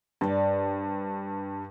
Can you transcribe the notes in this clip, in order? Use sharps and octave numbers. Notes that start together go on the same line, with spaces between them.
G2 C5 D5